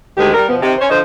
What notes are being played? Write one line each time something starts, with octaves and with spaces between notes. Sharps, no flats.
D2 D#3 G#3 G4
G3 A#4
B2 F3 B3
C3 D#3
C#4 C5
D3 F3 C5 D#5